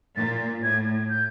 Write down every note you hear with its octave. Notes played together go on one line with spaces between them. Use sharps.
A#2 A6
A2 G#6
G6